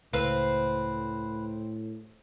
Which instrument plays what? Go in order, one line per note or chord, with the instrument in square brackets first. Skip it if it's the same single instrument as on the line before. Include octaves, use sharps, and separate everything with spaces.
[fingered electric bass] C#2 [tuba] A2 [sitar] C4 [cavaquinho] B4 F5